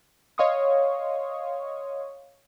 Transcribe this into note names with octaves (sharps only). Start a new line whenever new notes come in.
C#5 D#5 F5 C6 C#6 D#6